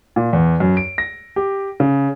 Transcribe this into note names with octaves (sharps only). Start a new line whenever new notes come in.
A#2
E2
F#2
D7
A#6
G4
C#3